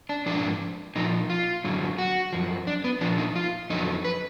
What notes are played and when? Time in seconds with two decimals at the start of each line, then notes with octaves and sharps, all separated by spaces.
0.09 D4
0.26 G#2 F3 D4
0.96 A#2 F3 D#4
1.30 F4
1.64 F#2 D3 F#3
1.98 F#4
2.33 F#2 F3
2.67 D4
2.84 B3
3.01 A#2 F3 D4
3.18 D#4
3.36 F4
3.70 F2 D3 F#3 D#4
4.04 B4